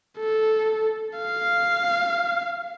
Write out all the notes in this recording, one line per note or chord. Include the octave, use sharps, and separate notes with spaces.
A4
F5